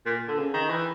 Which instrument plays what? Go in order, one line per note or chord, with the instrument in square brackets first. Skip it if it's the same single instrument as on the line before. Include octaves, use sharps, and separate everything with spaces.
[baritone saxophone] A#2
D3
C#3
D#3
E3